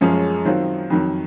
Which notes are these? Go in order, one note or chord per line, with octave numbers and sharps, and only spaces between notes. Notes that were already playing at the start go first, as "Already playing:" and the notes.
F#2 F3 G#3 C#4 G#4
D#3 F#3 C4 F4
F2 D#3 F#3